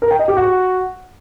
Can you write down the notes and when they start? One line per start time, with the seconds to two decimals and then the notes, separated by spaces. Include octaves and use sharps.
0.02 A#4
0.11 G5
0.19 D#5
0.28 G4
0.37 F#4